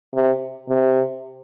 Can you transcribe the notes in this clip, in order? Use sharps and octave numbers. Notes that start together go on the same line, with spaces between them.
C3
C3